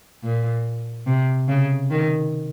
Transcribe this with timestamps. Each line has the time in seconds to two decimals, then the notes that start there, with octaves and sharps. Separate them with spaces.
0.23 A#2
1.07 C3
1.48 C#3
1.90 D#3